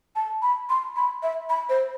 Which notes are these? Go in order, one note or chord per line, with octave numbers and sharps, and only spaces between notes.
A5
B5
C6
B5
E5
B5
C5